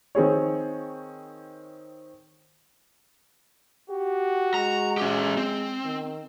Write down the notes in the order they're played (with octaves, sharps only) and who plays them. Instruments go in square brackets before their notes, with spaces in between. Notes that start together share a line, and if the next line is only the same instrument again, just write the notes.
[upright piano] D#3 C4 G#4 C#5
[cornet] F#4 [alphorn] G4
[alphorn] G#3 [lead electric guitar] A#5
[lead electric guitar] C#4 G4
C4
[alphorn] D#3